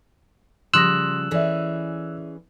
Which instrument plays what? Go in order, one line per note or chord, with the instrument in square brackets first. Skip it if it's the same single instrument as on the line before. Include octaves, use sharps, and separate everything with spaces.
[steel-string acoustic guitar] C#3 F3 G3 [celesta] C6 D#6 A#6 [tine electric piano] E6 F#6
[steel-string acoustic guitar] E3 C#4 G#4 [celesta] A4 D5 E5